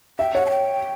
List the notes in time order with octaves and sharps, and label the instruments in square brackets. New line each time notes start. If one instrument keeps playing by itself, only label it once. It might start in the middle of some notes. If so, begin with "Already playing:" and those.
[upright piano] E5 [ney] G5
[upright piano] C#5 [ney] F#5
[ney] A5
G5